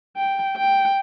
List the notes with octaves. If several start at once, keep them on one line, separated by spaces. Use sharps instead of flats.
G5
G5